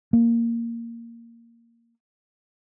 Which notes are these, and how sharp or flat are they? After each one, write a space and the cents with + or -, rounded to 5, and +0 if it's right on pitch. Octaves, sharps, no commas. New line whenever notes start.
A#3 -5